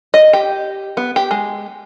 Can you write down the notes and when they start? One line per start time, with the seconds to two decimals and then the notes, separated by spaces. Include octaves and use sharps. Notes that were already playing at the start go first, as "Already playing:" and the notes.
0.14 D#5
0.33 G4
0.97 B3
1.16 G4
1.31 G#3